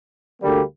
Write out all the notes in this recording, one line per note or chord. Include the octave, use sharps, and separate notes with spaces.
D2 D3 G3 A#3